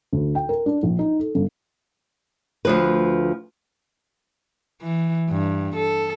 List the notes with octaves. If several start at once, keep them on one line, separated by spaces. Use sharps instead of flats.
D2
G5
A#4
D4
A#1
D#4
A4
G1
D2 F3 B4
E3
G2
A4